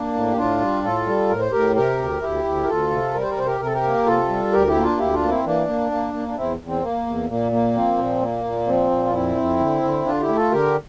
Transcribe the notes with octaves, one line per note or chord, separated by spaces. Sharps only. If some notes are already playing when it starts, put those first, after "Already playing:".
Already playing: A#3 D4
A2
G4
A2 D4 F4
G3
A2 F4 A4
G3
A2 A#4
C5
A2 G4 A#4
C3 G4 A#4
D2
D2 E4 G4
D2
A#4
D2 F4 A4
C3
G3 A#4
C5
A#4
C3 C5
G4 A#4
C3 A#4
A4
G4 A#4
A#3
C3 F4 A4
G3
D2 G4 A#4
E4 G4
A#3
D4 F4
D2 E4 G4
D4 F4
A#3
C4 E4
E3 A#3 D4
A#3
A#3
A#3
D4
E2 C4 E4
E2
C4
A#3
E2
A#2 A#3
A#3
F3 C4
A#2
A#3
A#2
F3 C4
A#2
F4
F2 C4 E4
F2
D3
D3
D3 D4 F4
E4 G4
A3
F4 A4
D3 G4 A#4